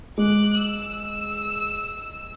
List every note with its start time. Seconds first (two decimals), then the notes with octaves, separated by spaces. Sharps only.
0.18 G#3 D6 F#6
0.57 E6